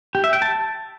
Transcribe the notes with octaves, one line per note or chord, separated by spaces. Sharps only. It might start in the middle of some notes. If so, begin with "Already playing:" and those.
G4
E5
G5
A5